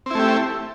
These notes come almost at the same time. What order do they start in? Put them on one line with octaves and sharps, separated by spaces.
C4 E4 A3 G4